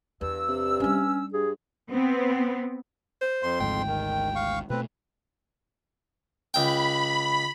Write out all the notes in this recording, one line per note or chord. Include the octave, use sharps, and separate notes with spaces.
E2 G2 E6
C3
G3 C#4 D4
G2 G#4
B3 C4
C5
F2 C6
G#1 D2 G#2 G5
D#3
F5 C#6
B2 A3 C4 B4
C#2 G5 B5